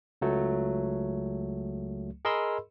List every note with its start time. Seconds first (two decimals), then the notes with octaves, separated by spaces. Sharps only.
0.22 C#2 F#3 A3
2.25 G#4 A#4 D#5 B5 C6 E6